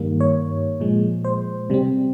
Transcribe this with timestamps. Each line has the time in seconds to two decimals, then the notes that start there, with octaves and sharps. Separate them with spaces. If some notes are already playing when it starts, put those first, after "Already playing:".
Already playing: G2 D#3 G3 A#3
0.20 C#5
0.80 A#2 F3 G#3
1.24 C5
1.70 C3 G3 C4